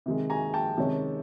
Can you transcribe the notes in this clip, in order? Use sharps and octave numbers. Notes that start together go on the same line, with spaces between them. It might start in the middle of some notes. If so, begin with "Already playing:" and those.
C3 D#3 G#3
G#5 A#5
G5 A5
C3 D#3 G#3 C#4